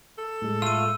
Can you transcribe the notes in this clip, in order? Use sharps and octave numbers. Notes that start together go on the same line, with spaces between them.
A4
A2 G#3
A3 F4 E6 D#7